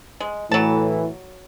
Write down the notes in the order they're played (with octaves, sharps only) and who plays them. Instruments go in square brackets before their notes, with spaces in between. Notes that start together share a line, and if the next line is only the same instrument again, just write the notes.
[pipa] G#3
[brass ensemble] A2 E3 [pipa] F#3 A5